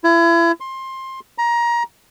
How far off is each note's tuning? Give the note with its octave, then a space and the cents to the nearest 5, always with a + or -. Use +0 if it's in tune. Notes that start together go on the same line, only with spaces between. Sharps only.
E4 +35
C6 +20
A#5 +20